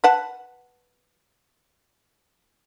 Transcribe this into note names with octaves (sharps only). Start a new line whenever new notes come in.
B4 F#5 A5